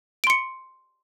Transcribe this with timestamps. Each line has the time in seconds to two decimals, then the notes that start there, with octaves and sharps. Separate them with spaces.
0.24 D7
0.27 C6
0.30 C#7